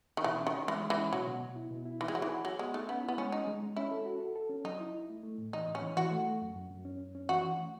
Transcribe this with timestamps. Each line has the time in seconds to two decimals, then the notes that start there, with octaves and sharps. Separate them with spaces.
0.17 D#3
0.24 B2 E3
0.38 C#4
0.47 D#3
0.54 C#4
0.68 E3 G#3
0.83 G#3
0.90 E3
0.98 C#4
1.13 B2 F#3
1.27 B2
1.42 B2
1.56 E4
1.71 B2
1.86 E4
2.00 E3 D#4
2.08 G#3
2.15 F#3 G#4
2.22 E3
2.29 G#4
2.45 F#3 G#4
2.59 G#3 B3
2.74 A3 D#4
2.89 B3 C#4
3.04 B3 E4
3.18 G#3 C#4
3.32 C#4 D#4
3.47 G#3
3.63 G#3
3.77 C#4 E4
3.91 A4
4.06 F#4
4.20 A4
4.36 A4
4.50 C#4
4.64 F#3 D#4
4.80 E4
4.94 E4
5.09 A3
5.23 A3
5.38 A2
5.53 E3 D#4
5.67 A2
5.75 C#4
5.82 E3
5.97 E3 F#4
6.12 A3
6.26 A3
6.42 F#2
6.55 F#2
6.71 F#2
6.85 C#4
6.99 F#2
7.15 C#4
7.29 E3 F#4
7.44 E3
7.58 A3